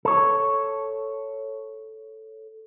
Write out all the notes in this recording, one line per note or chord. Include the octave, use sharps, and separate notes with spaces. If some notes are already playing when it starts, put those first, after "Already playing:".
A4 C#5